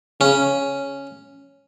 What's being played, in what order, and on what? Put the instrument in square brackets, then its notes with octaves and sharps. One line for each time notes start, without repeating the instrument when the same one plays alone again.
[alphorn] C#3 [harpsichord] C#4